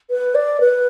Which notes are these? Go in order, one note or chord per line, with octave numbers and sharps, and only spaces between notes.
B4
D5
B4